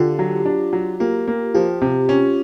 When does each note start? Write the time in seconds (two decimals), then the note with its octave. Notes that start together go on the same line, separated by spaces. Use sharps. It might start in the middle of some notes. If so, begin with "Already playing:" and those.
Already playing: D3 F4 G4
0.19 F#3
0.46 D4
0.73 F#3
1.00 A#3 F4 G4
1.28 A#3
1.54 F3 F4 G4
1.82 C3
2.09 C#4